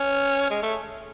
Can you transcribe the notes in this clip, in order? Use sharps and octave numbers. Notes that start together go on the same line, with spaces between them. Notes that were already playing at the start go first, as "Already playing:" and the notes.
Already playing: C#4
G#3
A3